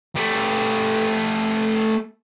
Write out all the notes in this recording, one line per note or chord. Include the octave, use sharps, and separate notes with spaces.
A3 G4